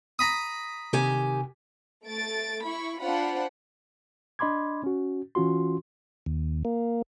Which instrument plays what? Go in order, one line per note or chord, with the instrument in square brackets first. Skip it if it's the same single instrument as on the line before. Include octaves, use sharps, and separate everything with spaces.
[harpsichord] A#5 B5 D#6
[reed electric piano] C3 [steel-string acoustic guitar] D#3 G4 G#5
[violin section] A3 A6 D7
E4 B5 C#6
D4 F4 C5 F#5 B5
[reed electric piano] D4 D#5 B5 C6 D6 G#6
C#4 F#4
E3 C#4 F4 F#4 C6
[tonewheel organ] D#2
A#3